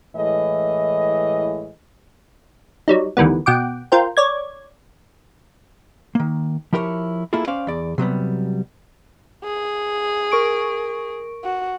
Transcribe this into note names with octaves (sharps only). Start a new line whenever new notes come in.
A2 E3 G#3 D#5
F#3 G3 D#4
D2 D#3 E3 G3 B3
B2 F#5 G5 D6
F4 A#4 C5 G5
C#5 D5 G#6
D#3 A#3
F3 E4 G4 A#4 B4 C#5
A#3 E4 F4 G#4 A4
C#4 C5 D5 F5
E2 D5
C3 F#3 G3 B3
G#4
A#4 C#6 D7
F#4